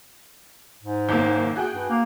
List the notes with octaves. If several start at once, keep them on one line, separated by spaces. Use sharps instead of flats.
G#2
F#1 D#2 A#3
F#4 G#4 G5
G2
A#3